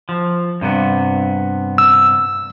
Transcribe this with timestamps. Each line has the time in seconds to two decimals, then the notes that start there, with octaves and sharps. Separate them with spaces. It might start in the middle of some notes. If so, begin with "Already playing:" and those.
0.09 F3
0.61 G2 C3 B3
1.78 E6